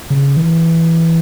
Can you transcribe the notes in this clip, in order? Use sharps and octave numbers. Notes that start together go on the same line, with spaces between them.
C#3
E3